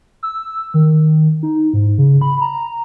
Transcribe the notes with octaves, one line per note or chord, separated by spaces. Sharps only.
E6
D#3
D#4
G#2
C#3
B5
A#5